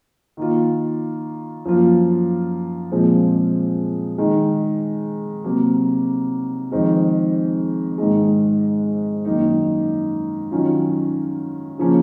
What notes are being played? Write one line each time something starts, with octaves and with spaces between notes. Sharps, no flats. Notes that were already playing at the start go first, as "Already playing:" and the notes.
D#3 A#3 F4
F#2 F3 A#3 F4
A#2 F3 G#3 C4
D#3 G#3 D#4
C3 F#3 A#3
F2 D#3 G#3 C4 D#4
G#2 D#3 G#3
F#2 D#3 A#3 D#4
D#3 F#3 C#4 F4
C#3 F3 A#3 C#4